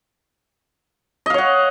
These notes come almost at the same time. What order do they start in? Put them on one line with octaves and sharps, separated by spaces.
D#5 F5 C#5 F#5